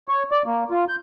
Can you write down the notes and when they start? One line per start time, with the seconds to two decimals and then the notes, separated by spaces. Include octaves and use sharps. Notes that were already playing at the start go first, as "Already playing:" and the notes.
0.08 C#5
0.32 D5
0.46 A#3
0.70 F4
0.88 G6